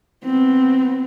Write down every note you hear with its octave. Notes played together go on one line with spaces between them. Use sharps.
B3 C4